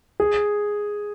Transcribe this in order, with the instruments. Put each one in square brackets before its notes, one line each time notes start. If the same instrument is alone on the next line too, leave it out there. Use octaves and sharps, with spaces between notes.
[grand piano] G#4